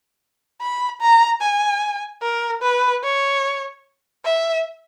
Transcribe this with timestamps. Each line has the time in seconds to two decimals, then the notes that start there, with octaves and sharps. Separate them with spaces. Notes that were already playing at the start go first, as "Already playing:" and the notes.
0.61 B5
1.02 A#5
1.42 G#5
2.22 A#4
2.63 B4
3.04 C#5
4.25 E5